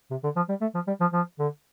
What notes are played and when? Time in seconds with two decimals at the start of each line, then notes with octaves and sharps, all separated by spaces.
0.11 C3
0.24 D3
0.36 F3
0.49 G3
0.61 A3
0.75 F3
0.87 G3
1.01 F3
1.13 F3
1.39 D3